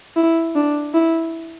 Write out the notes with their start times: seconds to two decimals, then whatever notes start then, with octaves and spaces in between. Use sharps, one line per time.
0.16 E4
0.55 D4
0.94 E4